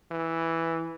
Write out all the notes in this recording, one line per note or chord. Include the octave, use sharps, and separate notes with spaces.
E3